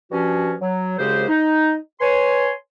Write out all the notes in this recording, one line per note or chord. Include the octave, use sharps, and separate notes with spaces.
G2 F3 C#4 F#4
F#3
C2 F#2 C#3 G#3 G4 C5
D#4
B4 C#5 G#5 C6